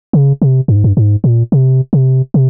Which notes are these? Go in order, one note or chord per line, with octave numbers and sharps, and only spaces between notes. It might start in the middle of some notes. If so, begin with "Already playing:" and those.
C#3
C3
G2
G#2
G2
G#2
A#2
C3
C3
C3